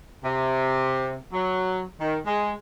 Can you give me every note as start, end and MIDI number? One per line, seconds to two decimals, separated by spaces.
0.24 1.17 48
1.33 1.81 54
2.00 2.18 51
2.26 2.51 56